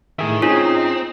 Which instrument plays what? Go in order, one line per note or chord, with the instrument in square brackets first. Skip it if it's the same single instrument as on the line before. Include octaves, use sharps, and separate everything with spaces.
[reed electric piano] A2 G#4 E5 [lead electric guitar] D#3
[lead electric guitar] C4 [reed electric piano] C#4 G#4 [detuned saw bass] D#4 [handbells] F4